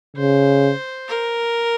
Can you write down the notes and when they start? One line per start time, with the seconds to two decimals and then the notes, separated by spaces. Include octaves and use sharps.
0.17 C#3 C5
1.08 A#4